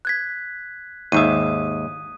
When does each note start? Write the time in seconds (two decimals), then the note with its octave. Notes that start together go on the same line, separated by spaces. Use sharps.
0.05 F#6 G#6 B6
1.12 D#2 G#2 E5 D#6 D#7